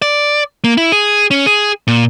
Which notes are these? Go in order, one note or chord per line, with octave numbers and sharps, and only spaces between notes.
D5
A#3
E4
G#4
C#4
G#4
A#2